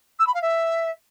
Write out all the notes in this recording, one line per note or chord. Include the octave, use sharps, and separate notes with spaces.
E6
B5
F5
E5